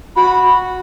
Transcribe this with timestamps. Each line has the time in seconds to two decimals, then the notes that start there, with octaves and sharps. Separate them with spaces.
0.16 F#4 B5